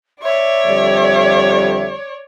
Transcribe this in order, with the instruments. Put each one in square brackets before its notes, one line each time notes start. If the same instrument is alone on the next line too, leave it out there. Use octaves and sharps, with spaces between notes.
[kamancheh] C#5 D5 [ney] E5
[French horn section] F2 D3 G3